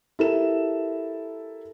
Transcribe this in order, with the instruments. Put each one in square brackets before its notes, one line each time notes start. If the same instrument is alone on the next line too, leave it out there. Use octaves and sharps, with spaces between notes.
[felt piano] E4 G4 A4 A#4 E7